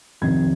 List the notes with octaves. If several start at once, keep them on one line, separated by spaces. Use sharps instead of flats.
F2 C3 D#3 G#6